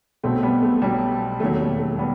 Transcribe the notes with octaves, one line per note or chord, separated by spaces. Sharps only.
B1 B2 F#3 A3 C4
G3 B3
A3
B1 B2 F#3 G3
E1 D#2 D#3 F#3 A3
G3
A3
G3 B3